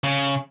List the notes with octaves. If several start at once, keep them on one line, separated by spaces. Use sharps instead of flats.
C#3